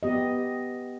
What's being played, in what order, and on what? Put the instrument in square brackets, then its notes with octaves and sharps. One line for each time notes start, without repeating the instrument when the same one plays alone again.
[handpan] B3 G4 D#5